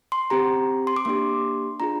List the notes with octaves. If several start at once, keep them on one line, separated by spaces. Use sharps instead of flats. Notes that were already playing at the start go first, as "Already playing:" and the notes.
C6
C4 G4 A#5
C6
D6
A#3 D4 G4 C6
D4 F4 G#4 A#5